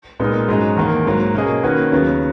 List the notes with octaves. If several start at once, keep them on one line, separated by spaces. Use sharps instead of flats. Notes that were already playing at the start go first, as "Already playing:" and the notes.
A#2 G#3 B3 D#4 A#4
G#2 F#3 C#4 G#4 D#5
E2 D#3 A#3
G#2 F#3 A#3
B2 A#3 C#4 G#4 D#5
D#3 A#3 C#4 F#4 B4
D#2 C#3 F#3 B3